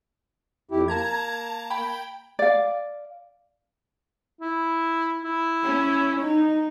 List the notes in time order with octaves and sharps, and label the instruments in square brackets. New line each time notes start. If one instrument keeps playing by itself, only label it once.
[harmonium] F2 E4 G4
[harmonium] A#3 [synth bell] A5 A#5 G#6
[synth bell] G5 B5
[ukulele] D5 F5
[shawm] E4
E4
[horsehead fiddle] C#4
D#4